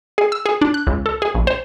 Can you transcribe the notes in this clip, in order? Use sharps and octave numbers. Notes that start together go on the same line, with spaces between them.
G#4
E6
G#4
D4
F#6
C#2
A4
G#4
A#1
C5